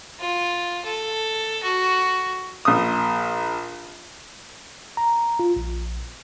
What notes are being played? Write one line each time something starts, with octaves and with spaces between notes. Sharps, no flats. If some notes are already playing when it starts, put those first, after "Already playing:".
F4
A4
F#4
A#1 D#6
A#5
F4
A#1